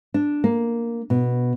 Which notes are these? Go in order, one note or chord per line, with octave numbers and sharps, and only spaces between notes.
D4
A#3
B2